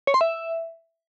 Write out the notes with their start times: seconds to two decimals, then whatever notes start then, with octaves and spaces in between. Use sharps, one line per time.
0.07 C#5
0.14 C6
0.21 E5